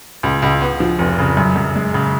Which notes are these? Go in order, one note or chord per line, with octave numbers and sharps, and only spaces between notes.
C#2
C#2
B3
F3
F1
C#3
F#2
F#2
G#3
C#3